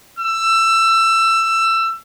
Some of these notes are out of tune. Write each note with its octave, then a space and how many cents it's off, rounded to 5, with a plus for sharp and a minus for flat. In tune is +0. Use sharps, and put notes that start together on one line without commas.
E6 +20